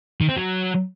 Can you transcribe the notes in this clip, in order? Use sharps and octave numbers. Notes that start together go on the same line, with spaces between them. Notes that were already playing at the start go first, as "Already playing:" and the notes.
D#3
C4
F#3